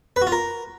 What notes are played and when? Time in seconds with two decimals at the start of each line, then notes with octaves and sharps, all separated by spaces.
0.16 B4
0.22 F#4
0.27 F4
0.32 A#4